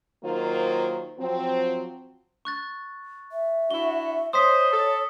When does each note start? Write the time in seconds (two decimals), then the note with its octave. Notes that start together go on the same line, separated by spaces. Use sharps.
0.23 D#3 F#3 A#3 F4 C5
1.19 F3 F#3 C4
2.45 C#6 F#6 A6
3.32 E5
3.71 D4 E4 F#4 G7
4.33 C5 C#5 D#5 D#6 B6
4.72 A4